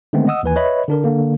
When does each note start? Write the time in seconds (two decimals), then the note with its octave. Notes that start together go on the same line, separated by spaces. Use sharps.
0.13 D3 D#3 G#3 A3 B3 C4
0.27 D#5 F#5 D#6 E6
0.43 D#2 E3 B4 G#5
0.56 B4 C#5 D#5 E5 B5
0.88 D3 D4 A#4
1.04 D3 A#3